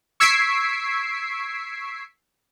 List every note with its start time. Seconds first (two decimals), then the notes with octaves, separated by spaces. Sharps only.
0.20 C#6 E6 G#6 B6 C7 D7